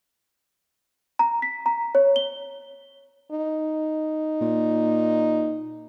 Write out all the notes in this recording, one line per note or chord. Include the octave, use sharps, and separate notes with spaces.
A#5
B6
A#5
C#5
G7
D#4
A#2